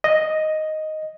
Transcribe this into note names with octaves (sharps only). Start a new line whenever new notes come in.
D#5